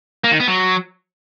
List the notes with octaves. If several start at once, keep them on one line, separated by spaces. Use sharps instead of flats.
A#3
D#3
B3
F#3